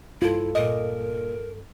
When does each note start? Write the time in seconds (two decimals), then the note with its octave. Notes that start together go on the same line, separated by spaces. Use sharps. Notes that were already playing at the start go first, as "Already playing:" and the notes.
0.22 C2 G2 E4 F4 A4
0.55 A#2 A#4 D#5